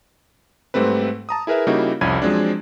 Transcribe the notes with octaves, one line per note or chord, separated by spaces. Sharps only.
G#2 G3 A3 C4 B4
A5 A#5 D#6
E4 G#4 A#4 B4 E5
C#3 G3 A#3 D#4 E4 F#4
C2 F2 C#4 B5 G#6 D#7
F3 F#3 G#3 C4 D4